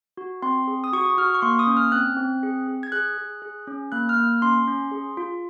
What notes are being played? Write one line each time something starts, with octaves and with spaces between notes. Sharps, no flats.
F#4
C4 C6
G#4
D#6
F#4 C#6
D#6
F#4 F6
C#6
A#3 C6
D#6
C#4
F6
C4 F#6
C4
G#4
G#4
G#6
G#4 F#6
G#4
G#4
C#4
A#3 F#6
F6
A#3
C#4 C6
C#4
G#4
F4